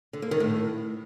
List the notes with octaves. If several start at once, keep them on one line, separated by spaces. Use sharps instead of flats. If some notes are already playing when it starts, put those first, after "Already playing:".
D3
A#3
D#3
A2